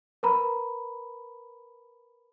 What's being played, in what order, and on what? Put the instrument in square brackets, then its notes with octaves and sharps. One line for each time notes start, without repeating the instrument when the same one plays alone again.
[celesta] A#4 B4 A#5 B5